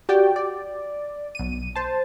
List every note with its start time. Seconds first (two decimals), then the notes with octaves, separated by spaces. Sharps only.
0.09 F#4 G4 D5 G5
0.36 D5
1.35 B1 D#7
1.76 C5 A5